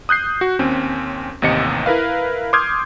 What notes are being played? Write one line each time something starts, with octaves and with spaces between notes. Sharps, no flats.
D#6 F#6 G6 C7
F#4
D#2 C4 C#4
A1 D#2 C3 D#5 C#7
E4 A#4 B4 F5
C6 D6 D#6 F6 G6 G#6